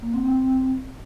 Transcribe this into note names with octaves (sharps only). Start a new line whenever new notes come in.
A#3
C4
C4